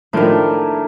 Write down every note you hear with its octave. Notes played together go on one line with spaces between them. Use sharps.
A2 D#3 F3 A3 D4 E4 A#4